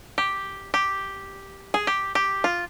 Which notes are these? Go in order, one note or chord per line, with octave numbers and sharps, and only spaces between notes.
G4
G4
G#4
G4
G4
F4